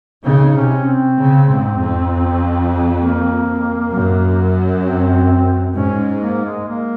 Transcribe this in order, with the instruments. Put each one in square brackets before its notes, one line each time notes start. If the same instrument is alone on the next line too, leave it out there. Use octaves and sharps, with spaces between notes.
[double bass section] C#3 [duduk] D#4
[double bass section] C3 [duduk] C#4
[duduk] C4
[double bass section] C#3
G#2
F2
[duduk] A#3
[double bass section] F#2
[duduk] C4
[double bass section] G#2 [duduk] C#4
[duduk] A#3
G#3
A#3